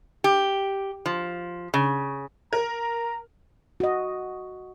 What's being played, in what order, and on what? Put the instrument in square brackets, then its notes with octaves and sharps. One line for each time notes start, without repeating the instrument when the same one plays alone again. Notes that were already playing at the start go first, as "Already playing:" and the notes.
[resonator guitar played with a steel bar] G4
F3
C#3
[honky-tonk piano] A#4 [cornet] A#5
[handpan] F#4 D#5